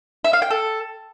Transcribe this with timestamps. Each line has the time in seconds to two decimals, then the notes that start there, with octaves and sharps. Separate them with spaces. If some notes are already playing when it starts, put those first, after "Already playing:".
0.24 E5
0.33 F5
0.42 G5
0.51 A4